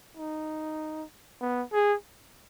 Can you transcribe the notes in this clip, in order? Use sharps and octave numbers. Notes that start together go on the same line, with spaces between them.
D#4
B3
G#4